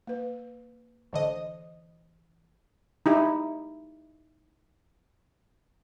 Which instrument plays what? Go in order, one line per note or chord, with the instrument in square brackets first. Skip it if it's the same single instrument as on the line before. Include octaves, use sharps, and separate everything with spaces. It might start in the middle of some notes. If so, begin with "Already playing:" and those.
[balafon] A#3 B4
[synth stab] A1 D3 D#5 [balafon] E3 C5
[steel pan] D#4 E4 G4